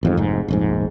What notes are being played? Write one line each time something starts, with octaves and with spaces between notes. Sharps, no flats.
A1 F2 G#2
F1 G#2
F1 A#1 G#2